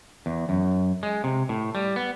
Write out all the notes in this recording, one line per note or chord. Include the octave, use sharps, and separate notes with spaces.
E2
F#2
G#3
C3
A2
G3
B3